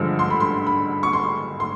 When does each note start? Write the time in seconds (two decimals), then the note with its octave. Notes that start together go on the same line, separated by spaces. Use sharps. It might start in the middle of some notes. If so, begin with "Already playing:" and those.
Already playing: G2 D3 F3 G#3
0.19 C6
0.30 B5
0.40 C6
0.67 B5
1.03 C#6
1.13 C6
1.60 C6